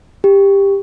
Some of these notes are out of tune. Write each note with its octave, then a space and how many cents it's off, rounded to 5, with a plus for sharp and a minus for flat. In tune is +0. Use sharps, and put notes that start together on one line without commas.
G4 +15